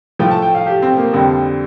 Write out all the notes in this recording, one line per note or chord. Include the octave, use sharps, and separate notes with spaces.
A2 F3 A3 G5
A5
G5
F5
G4
C4
A#3
F2 D3 G3 C4